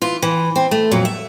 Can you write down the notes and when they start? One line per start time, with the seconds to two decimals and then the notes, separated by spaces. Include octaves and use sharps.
0.02 E3 F4
0.22 E3
0.55 C4
0.71 A3
0.91 F2 A#2 F#3
1.05 E5